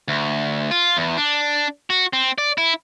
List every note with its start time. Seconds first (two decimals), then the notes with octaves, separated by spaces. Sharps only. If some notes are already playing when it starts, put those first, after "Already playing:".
0.08 D2
0.71 F4
0.97 E2
1.17 D4
1.90 F#4
2.13 C4
2.38 D5
2.58 E4